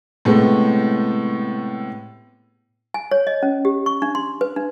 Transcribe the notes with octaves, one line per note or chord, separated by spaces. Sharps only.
A2 C3 G#3 A3 B3
G#5
C#5
D#5
C#4
G4
C#6
D4
C6
B4
D4